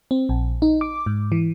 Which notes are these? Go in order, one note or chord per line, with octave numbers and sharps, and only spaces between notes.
C4
A#1
D#4
D6
G#2
E3